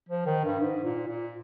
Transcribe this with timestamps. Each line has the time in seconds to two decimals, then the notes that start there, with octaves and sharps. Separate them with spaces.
0.09 F3
0.26 D#3
0.44 G2
0.60 G#2
0.84 A#2
1.07 A#2